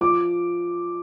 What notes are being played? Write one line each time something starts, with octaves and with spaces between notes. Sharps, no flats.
F3 D6